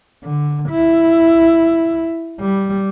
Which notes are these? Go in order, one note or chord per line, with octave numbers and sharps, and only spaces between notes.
D3
E4
G3